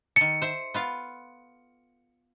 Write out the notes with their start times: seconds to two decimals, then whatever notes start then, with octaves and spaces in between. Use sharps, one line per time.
0.16 D#3 A4 C#7
0.42 C5 E5
0.74 B3 F4 F5